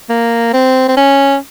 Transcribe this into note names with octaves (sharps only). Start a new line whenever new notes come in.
A#3
C4
C4
C#4